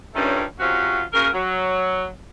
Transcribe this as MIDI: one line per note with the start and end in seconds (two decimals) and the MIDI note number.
0.14 0.42 43
0.14 0.42 51
0.14 0.42 53
0.14 0.42 57
0.14 0.42 61
0.59 1.00 42
0.59 1.00 48
0.59 1.00 60
0.59 1.00 61
0.59 1.00 65
0.59 1.00 66
1.13 1.27 49
1.13 1.27 58
1.13 1.27 66
1.13 1.27 70
1.33 2.04 54